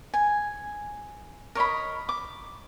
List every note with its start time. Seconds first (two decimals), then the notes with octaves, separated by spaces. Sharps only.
0.14 G#5
1.55 A#4 C#5 D#5 B5
2.09 D6